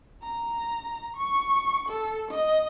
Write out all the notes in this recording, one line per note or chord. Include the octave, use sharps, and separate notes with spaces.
A#5
C#6
A4
D#5